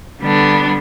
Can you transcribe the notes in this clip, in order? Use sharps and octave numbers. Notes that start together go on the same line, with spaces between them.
D3 G3 B3 D4